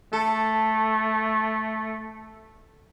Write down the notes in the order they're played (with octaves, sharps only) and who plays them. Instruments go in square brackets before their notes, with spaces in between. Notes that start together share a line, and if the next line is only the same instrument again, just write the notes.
[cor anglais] A3 [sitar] A4